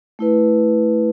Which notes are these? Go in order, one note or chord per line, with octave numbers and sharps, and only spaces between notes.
A3 E4 B4